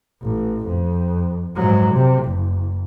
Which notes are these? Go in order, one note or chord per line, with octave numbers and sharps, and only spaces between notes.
A1
F2
G#2 F#3
C3
F#1